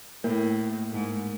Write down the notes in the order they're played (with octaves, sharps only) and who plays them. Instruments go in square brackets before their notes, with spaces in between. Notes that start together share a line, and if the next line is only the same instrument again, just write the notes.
[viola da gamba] A2 [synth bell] A#3 A#4
[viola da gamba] G#2